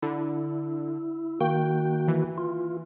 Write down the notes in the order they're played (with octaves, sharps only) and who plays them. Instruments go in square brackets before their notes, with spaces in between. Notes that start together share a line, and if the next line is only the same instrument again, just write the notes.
[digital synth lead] D3 [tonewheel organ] E4
[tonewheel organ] D#3 A#3 F#4 [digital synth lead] G5
[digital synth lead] E3
[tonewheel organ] F4